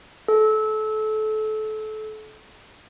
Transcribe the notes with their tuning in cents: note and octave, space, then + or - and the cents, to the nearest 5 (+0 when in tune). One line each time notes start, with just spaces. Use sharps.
A4 -25